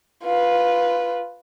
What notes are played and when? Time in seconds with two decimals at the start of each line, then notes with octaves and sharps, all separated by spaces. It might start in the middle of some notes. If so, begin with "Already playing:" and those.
0.24 F4 B4